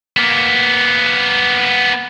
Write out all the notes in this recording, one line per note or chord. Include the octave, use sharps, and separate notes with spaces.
A#3 B3